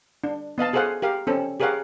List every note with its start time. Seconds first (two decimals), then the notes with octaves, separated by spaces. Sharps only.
0.24 D4
0.58 B3 D#5 F5 A5
0.73 F#4 G#4 A4 C5 F5 F#5
1.02 G4 A#4 F5
1.27 C4 C#4 A4
1.60 G4 G#4 A#4 C#5 F5 F#5